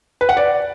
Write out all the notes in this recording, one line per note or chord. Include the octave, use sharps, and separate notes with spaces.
B4
F#5
D5